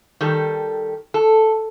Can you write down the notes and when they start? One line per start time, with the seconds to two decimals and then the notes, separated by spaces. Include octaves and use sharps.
0.21 D#3 G3 A4
1.14 A4